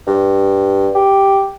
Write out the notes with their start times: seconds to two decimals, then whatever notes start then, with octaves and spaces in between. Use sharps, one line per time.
0.07 G2
0.95 G4